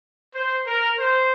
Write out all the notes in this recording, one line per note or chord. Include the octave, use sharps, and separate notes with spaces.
C5
A#4
C5